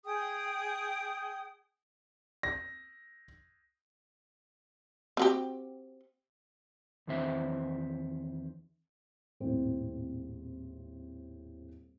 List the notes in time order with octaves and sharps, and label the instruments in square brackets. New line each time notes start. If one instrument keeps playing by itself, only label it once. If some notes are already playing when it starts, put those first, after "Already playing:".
[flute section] G#4 G5 D#6
[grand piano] A#6
[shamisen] C4 F#4 G4
[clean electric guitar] E2 D#3 C4 C5 E5
[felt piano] D#1 G#1 A2 C4